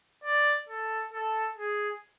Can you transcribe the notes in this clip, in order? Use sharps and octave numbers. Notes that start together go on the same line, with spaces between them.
D5
A4
A4
G#4